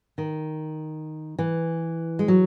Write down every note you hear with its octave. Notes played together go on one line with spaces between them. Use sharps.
D#3
E3
G#3
F#3